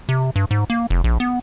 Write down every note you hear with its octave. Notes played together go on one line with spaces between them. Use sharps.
C3
G2
G#2
A#3
F1
A#1
B3